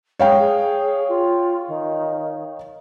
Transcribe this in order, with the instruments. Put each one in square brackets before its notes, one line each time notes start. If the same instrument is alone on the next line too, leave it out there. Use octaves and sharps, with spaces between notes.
[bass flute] G#3 [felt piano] C#5 F5 G5
[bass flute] G#4
F4
D#3